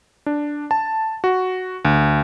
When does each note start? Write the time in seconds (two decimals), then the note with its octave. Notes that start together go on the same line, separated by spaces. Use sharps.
0.26 D4
0.71 A5
1.24 F#4
1.85 D2